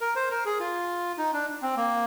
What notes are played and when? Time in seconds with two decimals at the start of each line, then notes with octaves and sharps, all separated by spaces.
0.01 A#4
0.16 C5
0.31 A#4
0.45 G#4
0.60 F4
1.18 D#4
1.33 D4
1.62 C4
1.76 A#3